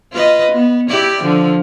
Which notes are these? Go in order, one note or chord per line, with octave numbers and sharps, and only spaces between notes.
F4 B4 D#5
B3
E4 G4 D5
D3 F3